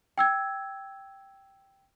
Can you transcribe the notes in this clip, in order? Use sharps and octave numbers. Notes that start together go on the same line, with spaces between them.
G5 E6 G#6